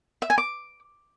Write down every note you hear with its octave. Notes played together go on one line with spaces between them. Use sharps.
E5
G#5
D6